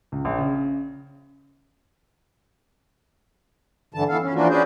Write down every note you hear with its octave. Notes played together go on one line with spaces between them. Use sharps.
C#2
A#1
C#3
G2 D3 E3 A5
E3 B3 A4 F5
C#4
E3 F3 A#3 D4 F4 F#4
C#4 D4 F#4 G#4 B4 C5